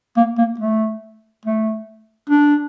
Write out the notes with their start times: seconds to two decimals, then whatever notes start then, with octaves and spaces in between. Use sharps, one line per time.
0.17 A#3
0.38 A#3
0.59 A3
1.45 A3
2.29 D4